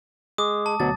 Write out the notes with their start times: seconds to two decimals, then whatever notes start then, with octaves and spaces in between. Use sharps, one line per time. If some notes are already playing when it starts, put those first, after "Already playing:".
0.38 G#3 D6 D#6
0.66 A5
0.80 D2 B2 F#3 A6